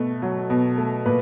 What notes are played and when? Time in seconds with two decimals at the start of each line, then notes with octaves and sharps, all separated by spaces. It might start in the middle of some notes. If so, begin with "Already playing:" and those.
Already playing: B2 A3
0.22 F#3
0.50 B2
0.77 A3
1.06 A#2 B4